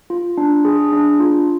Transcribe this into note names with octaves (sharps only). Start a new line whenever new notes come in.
F4
D4
G#4
D4
F4